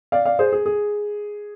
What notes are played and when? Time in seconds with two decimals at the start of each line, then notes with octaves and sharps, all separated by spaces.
0.12 D5 F5
0.25 D5 F5
0.39 G#4 C5
0.53 G#4
0.66 G#4